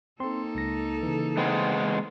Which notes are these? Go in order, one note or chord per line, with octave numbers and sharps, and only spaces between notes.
A#3 C4 D#4 A4 C6
C#2 A#6
C#3 E3
G#3 B3 C4